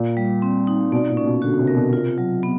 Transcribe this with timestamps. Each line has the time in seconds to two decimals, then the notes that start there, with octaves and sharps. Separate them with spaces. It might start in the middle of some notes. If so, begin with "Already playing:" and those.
Already playing: A#2
0.17 G3
0.42 C4
0.67 D#4
0.92 B2 D5
1.10 A#2
1.17 C#4
1.25 B2
1.42 D3 F#4
1.59 C3
1.67 A#4
1.76 B2
1.93 C3 F4
2.18 F#3
2.43 B3